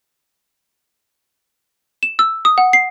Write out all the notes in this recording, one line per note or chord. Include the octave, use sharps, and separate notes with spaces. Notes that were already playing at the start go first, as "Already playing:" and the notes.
E7
E6
D#6
F#5
C7